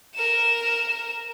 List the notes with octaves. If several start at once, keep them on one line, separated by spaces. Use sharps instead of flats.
A#4 E7